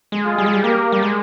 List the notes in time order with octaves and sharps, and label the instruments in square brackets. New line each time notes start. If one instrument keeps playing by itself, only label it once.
[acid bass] G#3
[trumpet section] F4 G#4
[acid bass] G3
G#3
G3
[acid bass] A#3 [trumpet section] G4 A#4
[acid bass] G3
G#3